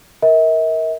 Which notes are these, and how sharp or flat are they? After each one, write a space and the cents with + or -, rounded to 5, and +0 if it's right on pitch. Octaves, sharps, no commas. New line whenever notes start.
A#4 +0 E5 -45